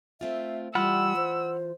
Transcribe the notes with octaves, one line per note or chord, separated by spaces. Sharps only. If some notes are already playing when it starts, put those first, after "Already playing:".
A3 C4 F4 E5
E3 G3 F4 F#5 A5 B5 E6 F6
C5